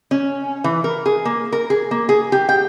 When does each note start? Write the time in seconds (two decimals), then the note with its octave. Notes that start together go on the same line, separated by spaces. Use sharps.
0.11 C#4
0.64 E3
0.84 A#4
1.06 G#4
1.25 A#3
1.53 A#4
1.70 G#4
1.91 A#3
2.09 G#4
2.32 G4
2.49 G5